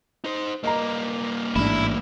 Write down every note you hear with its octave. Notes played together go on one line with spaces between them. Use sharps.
D#4 C5
G2 A#3 D#5 A#5
A1 G#2 D4 E4